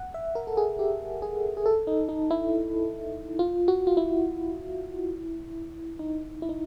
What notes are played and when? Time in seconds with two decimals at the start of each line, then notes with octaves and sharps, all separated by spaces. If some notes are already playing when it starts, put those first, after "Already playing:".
Already playing: F#5
0.14 E5
0.35 A#4
0.47 A4
0.57 G#4
0.79 G4
1.22 G#4
1.57 G#4
1.66 A4
1.87 D#4
2.09 D#4
2.31 E4
3.39 F4
3.68 F#4
3.87 F4
3.97 E4
5.99 D#4
6.42 E4
6.49 D#4